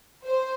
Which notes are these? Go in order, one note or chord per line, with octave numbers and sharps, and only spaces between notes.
C5